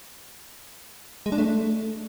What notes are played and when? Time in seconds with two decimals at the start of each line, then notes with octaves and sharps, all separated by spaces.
1.26 G#3
1.32 D4
1.38 A3